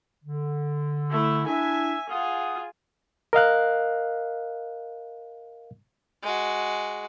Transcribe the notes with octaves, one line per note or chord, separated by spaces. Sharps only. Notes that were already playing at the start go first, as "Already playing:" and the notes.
D3
A3 E4
D4 E4 E5 G#5
F4 G#4 F#5 D#6
A#4 D#5 F5 F#6
G#3 F#4